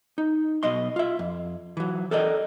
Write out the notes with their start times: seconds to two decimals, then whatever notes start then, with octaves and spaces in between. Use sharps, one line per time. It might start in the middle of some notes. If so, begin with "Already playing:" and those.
0.18 D#4
0.63 B1 B2 D#5 C6
0.96 F4 E5
1.19 F2
1.77 E3 F#3
2.11 A4 A#4 D5 D#5